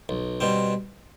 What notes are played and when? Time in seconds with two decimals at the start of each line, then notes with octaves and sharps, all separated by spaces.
0.09 B1
0.41 B2 G3 C4